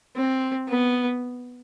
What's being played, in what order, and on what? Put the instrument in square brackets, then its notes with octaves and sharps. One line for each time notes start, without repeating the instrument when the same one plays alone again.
[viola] C4
B3